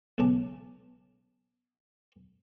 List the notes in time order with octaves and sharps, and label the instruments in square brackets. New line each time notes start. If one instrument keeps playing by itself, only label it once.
[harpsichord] B1 E2 C#3 A5 D6